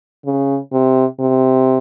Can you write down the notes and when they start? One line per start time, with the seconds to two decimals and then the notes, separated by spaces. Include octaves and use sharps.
0.25 C#3
0.72 C3
1.19 C3